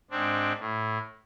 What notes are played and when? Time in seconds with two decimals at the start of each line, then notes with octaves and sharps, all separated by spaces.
0.11 G#2 C4 D4
0.59 A2